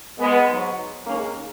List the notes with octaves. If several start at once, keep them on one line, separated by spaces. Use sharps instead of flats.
G#3 B3
G#2 F#3
D#2 D#3 G#3 A#3 C#4